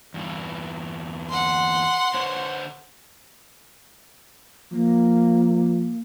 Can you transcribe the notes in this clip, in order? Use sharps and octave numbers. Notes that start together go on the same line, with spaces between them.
E2 G2 E3
F#5 C6
D3 C5 C#5
F3 A#3